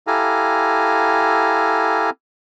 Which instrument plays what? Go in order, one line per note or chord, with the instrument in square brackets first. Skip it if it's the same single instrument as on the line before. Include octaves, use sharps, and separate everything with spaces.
[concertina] E4 G4 A4 F5 G#5 A#5